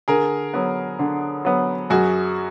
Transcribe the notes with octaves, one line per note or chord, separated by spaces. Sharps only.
D3 G#4 A#4
F#3 B3
D3
F#3 B3
F#2 F#4 G#4